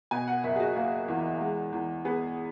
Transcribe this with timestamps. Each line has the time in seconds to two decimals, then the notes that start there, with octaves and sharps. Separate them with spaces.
0.11 B2 G#5
0.28 F#5
0.44 F#1 E5
0.56 G#4
0.60 F#4
0.76 A#3
1.08 E2
1.41 G#3
1.73 E2
2.05 B3 G#4